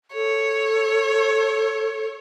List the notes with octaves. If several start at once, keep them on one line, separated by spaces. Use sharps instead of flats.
A4 C#5